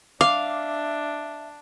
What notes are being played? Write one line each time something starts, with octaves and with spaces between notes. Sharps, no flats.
D4 E5 F5 D6